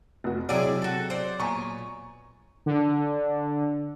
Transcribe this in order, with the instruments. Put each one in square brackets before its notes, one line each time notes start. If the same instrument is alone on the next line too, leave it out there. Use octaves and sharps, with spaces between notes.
[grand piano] F1 F#4
[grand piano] C3 [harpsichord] F#3 G#3 [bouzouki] E4 G#4 D5
[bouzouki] F#4 A4
C5 D5
[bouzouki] A#2 B3 [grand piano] G#5 A#5 C#6
[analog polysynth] D3